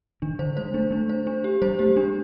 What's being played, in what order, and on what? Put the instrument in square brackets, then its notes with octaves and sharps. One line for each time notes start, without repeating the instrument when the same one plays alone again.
[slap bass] D#3 [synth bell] D4
[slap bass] D3 [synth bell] C5
[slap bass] G#3 [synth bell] C5
[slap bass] A3 [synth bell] D4
[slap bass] A3 [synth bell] D4
[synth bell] C5
D4
G4
[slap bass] G3 [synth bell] C5
[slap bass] A3 [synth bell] G4
[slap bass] G#3 [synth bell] D4